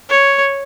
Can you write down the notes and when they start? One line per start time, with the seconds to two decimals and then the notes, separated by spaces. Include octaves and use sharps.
0.09 C#5